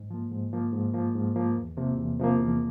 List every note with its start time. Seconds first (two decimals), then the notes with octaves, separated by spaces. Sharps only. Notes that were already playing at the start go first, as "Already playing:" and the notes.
Already playing: G#2
0.10 F3 A#3
0.31 G#2
0.53 F3 A#3
0.73 G#2
0.94 F3 A#3
1.15 G#2
1.36 F3 A#3
1.56 E2
1.77 C3 F3 A#3
1.97 E2
2.19 C3 F3 A#3
2.40 E2